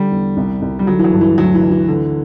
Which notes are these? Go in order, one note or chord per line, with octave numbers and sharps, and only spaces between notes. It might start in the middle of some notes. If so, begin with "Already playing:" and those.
Already playing: D3 G3
E2
C2
C2
G3
D3 F#3
E3
F#3
G2
E3
D2 F#3
E3
D2
E3
D3